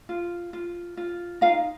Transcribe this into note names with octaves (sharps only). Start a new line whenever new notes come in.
F4
F4
F4
D#4 F4 F5